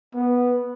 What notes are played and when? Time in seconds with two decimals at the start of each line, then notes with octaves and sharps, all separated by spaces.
0.14 B3